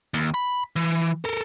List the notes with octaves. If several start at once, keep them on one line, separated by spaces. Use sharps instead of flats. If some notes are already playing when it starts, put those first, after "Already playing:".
D#2
B5
E3
A4 A#4